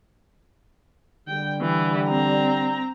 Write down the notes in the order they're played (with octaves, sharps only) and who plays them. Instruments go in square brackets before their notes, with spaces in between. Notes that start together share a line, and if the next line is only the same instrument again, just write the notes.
[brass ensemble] D3 G3 [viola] G5
[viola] E3
C4 A#5